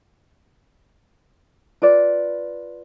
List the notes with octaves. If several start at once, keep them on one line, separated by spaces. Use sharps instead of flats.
F4 B4 D5